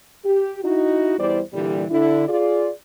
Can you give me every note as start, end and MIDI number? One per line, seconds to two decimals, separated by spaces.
0.25 0.59 67
0.63 1.16 63
0.63 1.16 64
0.63 1.16 66
1.18 1.41 40
1.18 1.41 55
1.18 1.41 64
1.18 1.41 72
1.18 1.41 74
1.53 1.85 46
1.53 1.85 50
1.53 1.85 52
1.53 1.85 55
1.90 2.25 50
1.90 2.25 64
2.28 2.70 65
2.28 2.70 68
2.28 2.70 74